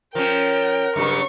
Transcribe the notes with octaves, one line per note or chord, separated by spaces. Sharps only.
F3 C#4 A#4 G5
G2 C#3 F#3 C#6